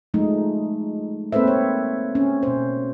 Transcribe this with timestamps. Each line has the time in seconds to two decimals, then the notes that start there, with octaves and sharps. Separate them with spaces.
0.14 F3 G#3 A3 D#4
1.32 A#3 C4 A4 B4 C5 E5
1.47 C#5
2.15 C#4
2.43 B2 C5